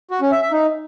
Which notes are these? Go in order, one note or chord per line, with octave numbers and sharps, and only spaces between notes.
F#4
C#4
E5
E5
D#4